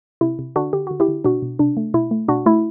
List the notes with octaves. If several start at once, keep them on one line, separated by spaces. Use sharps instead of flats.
C3 E4
C3
D3 D4 F#4
D3 G4
D3 F#4
E4 G4
D3
B2 D4 F#4
B2
C3 D4
A3
B2 E4
A3
B2 D4 F#4
A3 E4